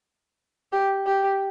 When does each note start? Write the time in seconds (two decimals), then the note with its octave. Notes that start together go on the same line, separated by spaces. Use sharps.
0.72 G4
1.06 G4